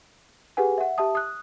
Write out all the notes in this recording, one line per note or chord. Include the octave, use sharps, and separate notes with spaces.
G4 G#4 B4 F#5 G#5
E5 F#5
G4 E5 A5 D#6
D#6 F#6